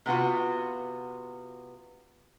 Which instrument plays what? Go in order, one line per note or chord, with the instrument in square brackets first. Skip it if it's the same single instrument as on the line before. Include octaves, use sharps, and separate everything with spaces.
[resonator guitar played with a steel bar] C3 B3 F4 F#4